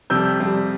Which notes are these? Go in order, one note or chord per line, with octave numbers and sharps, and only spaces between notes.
F2 C3 G3 E6 G6
F2 C3 G3